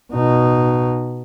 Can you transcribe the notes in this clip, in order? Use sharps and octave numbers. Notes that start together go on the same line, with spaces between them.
B2 D#4